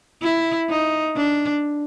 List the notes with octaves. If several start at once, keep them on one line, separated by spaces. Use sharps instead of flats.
E4
D#4
D4